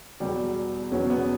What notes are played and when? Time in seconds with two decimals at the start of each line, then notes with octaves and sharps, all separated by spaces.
0.20 E2 B2 F#3 G3
0.92 E2 B2 F#3 C#4
1.10 B3